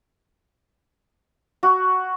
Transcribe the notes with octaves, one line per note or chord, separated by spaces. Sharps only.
F#4